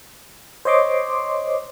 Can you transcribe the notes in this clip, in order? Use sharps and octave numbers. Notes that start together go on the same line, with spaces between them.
C5 C#5 D#5 C6 D6